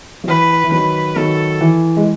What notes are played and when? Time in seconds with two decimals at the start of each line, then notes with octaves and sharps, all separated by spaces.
0.24 F#3
0.27 E3 B4
0.64 E3
0.72 D#3 F#3 B4
1.16 D#3 F#3 A4
1.61 E3
1.97 G#3